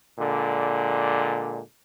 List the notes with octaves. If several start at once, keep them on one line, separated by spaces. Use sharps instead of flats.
A#2 D3 G#3